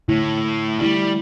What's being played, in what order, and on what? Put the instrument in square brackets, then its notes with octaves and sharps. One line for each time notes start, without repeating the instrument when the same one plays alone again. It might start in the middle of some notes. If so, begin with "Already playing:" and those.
[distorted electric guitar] A2 [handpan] D3 A3 E4
[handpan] D3 A3 E4 [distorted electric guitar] G3